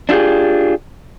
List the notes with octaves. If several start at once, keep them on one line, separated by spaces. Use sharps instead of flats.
D4 E4 F4 G4 G#4